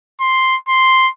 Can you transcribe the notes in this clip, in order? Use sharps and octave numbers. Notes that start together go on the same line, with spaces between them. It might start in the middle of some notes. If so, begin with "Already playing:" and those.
C6
C6